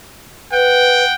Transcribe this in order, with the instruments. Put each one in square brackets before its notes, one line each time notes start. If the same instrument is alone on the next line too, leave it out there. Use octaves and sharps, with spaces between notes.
[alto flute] B4 [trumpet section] F#5 G5